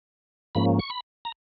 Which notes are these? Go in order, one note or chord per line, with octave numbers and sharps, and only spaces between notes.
G#2 F3 A#3 C#4 B5
C#6
B5
A#5